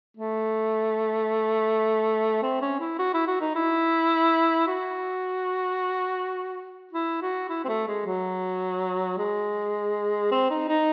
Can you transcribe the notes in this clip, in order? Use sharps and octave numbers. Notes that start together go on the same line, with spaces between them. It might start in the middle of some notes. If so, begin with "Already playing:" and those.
A3
C4
C#4
E4
F#4
E4
F#4
D#4
E4
F#4
E4
F#4
E4
C4
A3
G#3
F#3
G#3
C4
D#4
D#4